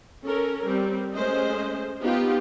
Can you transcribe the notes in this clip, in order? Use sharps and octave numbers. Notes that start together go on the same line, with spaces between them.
C#4 A4 A#4
G3 C4
G#3 A3 C#4 C5 D#5
B3 D#4 F4 G4